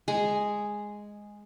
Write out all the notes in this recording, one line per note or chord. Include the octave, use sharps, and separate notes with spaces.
G#3 G#4